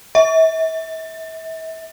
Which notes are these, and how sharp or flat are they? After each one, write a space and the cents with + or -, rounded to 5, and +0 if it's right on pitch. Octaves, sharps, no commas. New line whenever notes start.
E5 -35